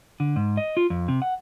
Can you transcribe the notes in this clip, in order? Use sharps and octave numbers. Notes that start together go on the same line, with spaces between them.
D3
G#2
D#5
F4
F2
C3
F#5